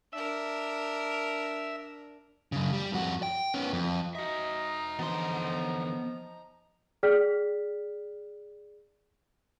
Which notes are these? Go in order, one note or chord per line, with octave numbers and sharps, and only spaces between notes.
D4 A#4 E5
F#2 C#3
G3
F2 F#4
G5
B3 C#4
F2
D#4 F#4 D#5 E5 A#5
D3 E3 F3 B3 C6
G#4 D5 G5 F6 B6